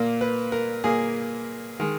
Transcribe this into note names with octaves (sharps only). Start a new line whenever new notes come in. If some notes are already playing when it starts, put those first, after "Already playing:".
Already playing: A#2 A#3
B4
A#4
A#2 A#3 G#4
D#3 G#3